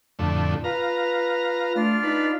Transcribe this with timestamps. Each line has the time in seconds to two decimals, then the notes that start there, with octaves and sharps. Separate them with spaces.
0.19 F2 A2 D3 A3
0.64 F4 B4 F5 A#5
1.75 A3 D4 F4 F6
2.03 D#4 B4